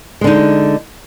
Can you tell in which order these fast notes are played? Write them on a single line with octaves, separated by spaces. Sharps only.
G#3 D3 D#4